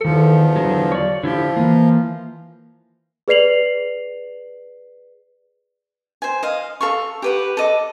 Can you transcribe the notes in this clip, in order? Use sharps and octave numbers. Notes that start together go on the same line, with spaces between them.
E2 D#3 F3 A4
D3 F#3
C#5 D5
D3 F3 E4 G4
E3 A#3
G#4 B4 D5 C7 F7 F#7
C5 G#5
D#5 F5
A4 F5 C#6
G4 B4 F#5
A4 D#5 D6